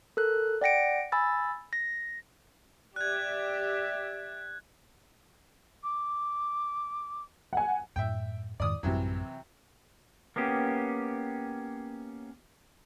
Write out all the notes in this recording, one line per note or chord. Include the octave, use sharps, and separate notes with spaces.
A4 A#4 F#6
D5 F#5 G5 A#6 C#7 D7
G#5 B5 E6 A6
A#6
G4 D5 E5 F#6 G#6
D6
F#5 G#5
F#2 A2 E5 G5
F2 G#2 D#3 D5 D#6
A1 F#2 C3 E3 F#3 G3
A#3 B3 C#4 G4